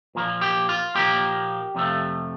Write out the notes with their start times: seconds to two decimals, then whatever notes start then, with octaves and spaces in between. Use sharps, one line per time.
0.15 A#2 F3 A#3
0.41 G4
0.69 F4
0.95 A#2 F3 A#3 G4
1.75 F2 C3 F3 A3